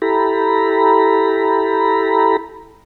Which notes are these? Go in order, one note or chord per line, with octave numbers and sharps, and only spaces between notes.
E4 G4 A4 A#5 B5